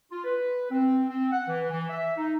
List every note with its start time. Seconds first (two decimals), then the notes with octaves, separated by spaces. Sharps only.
0.11 F4
0.24 B4
0.70 C4
1.08 C4
1.31 F#5
1.47 E3
1.70 E3
1.90 E5
2.16 D#4